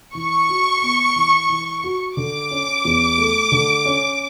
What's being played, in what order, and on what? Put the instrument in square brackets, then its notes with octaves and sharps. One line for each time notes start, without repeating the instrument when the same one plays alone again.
[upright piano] E3 [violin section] C#6
[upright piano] F#4
B3
E3
E3
F#4
[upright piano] D3 [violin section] D6
[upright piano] C#4
E2
A3
D3
C#4